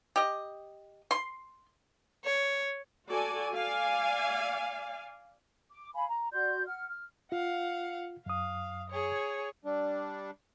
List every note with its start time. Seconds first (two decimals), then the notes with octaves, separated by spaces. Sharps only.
0.16 G4 D#5
1.11 C6
2.24 C#5
3.08 F#4 A4 D5 G#5
3.55 D5 F5 G#5
5.72 D6
5.95 F5 G#5 B5
6.08 A#5
6.32 F#4 D5 C6 G6
6.67 F#5 F6
6.89 F6
7.32 F4 F5 F#5
8.26 F#2 F5 D#6
8.90 G#4 C#5
9.65 G3 D4